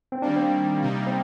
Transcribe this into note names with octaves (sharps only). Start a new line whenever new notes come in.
C4
D#3 G3 A#3 D4
C4
C3 G3 A#3 D#4
C4